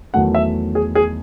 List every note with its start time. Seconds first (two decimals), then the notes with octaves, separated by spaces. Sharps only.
0.14 E2 D#3 F#3 A3 F#5
0.35 E5
0.75 G#4
0.95 G#4